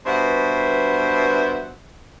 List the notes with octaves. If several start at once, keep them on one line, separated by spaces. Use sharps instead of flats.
G2 B2 C5 E5 F#5